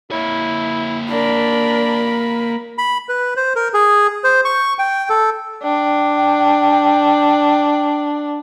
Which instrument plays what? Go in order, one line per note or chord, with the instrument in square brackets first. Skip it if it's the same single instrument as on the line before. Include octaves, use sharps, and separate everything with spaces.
[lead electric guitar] A#3 C#5 [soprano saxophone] E4
[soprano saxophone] D4 [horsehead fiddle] A#4 B5
[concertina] B5
B4
C5
A#4
G#4
C5
C#6
G5
A4
[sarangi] D4 [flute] G5